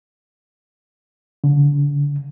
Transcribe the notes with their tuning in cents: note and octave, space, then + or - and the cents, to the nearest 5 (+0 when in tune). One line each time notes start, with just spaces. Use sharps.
D3 -35